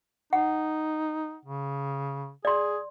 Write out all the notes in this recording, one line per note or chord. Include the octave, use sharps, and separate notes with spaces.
D#4 F#5
C#3
G#4 D5 C6